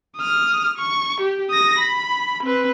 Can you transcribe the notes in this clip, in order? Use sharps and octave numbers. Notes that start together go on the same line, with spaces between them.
D#6 F6
C#6
G4
D#6 A#6
B5
C4 B4